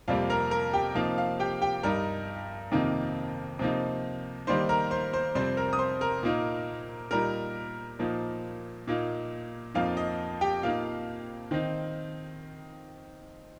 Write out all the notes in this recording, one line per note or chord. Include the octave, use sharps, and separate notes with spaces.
F2 C3 G3 A#3 F5
A#4 A#5
A#4 A#5
G4 G5
C3 F3 A#3 D#4 F5
F5
G4 G5
G4 G5
G2 G3 D#4 A#4 A#5
F2 C3 D#3 A#3 D#4
C3 F3 A#3 D#4
D#3 G3 A#3 D#4 C5 C6
A#4 A#5
C5 C6
C5 C6
F2 C3 G3 C4 C5 C6
A#4 A#5
D#6
C5 C6
A#4 A#5
A#2 A#3 D#4
A#2 G3 D#4 A#4 A#5
A#2 F3 A#3 D#4
A#2 A#3 D#4
F2 F3 A#3 D#4 F5
D#5
G4 G5
A#2 A#3 D#4 F5
D#3 C4 D#4